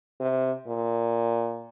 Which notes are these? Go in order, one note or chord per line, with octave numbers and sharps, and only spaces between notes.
C3
A#2